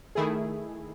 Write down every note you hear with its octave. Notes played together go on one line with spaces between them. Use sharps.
D#3 A3 E4 G#4